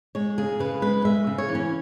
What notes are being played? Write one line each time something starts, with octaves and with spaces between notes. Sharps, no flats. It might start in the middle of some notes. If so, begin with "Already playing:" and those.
G#3 C#5
C#3 G#4
C#3 B4
G#3 B4
G#3 E5
C#3
C#5
E3
C#4